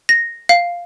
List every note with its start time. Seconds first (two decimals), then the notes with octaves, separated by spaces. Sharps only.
0.09 A#6
0.49 F5